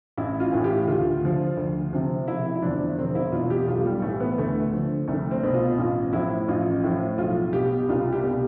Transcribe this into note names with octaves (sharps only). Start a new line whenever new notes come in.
A1 E4
F4
A2 E3
G4
D2 F4
D3 F3
D2
C3 F3
E1 E4
E4
E2 D3 F3 D4
E1 C4
E4
E2 B2 F4
G4
B1 F4
G3
A2 E3 A3
B3
D2 A3
D3 F3
C2 A3
C4
B2
F4
A1 F4
A2 F3 E4
A1 F4
A2 F3
B1 F4
B2 G4
C2 F4
G4
B2